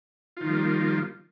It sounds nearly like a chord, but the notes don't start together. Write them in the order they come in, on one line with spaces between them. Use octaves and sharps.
F4 D#3 F3 G3 A#3